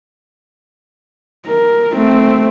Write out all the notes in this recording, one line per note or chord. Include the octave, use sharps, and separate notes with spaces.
A#4
A3 C4